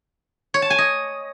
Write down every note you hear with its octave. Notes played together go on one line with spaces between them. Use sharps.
C#5
A5
G#5
D#5